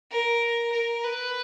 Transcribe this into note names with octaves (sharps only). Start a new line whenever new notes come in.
A#4
A#4
B4